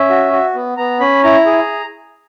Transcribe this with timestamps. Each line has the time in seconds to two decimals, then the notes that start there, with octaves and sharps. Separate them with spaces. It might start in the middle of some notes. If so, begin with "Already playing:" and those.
Already playing: C#4 E5
0.10 F#4
0.32 F#4
0.54 B3
0.77 B3 A#5
1.00 C#4 B5
1.24 E4 A#5
1.46 G#4